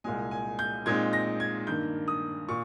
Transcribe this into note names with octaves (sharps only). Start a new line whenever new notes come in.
C2 A#2 G#3 G#5
G#5
G6
A#2 G#3 C4 D#4 G#6
A#6
G#6
G2 D#3 A#3 G6
D#6
A#2 C#6